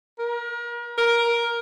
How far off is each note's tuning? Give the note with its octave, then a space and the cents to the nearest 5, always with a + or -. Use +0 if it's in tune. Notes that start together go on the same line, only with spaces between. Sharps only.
A#4 +35
A#4 +10